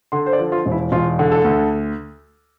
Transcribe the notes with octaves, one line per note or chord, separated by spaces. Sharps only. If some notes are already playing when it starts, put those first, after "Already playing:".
D3 C6
C5
D5
F3
F4
E1
E4
E1 F4
D3
A4
D2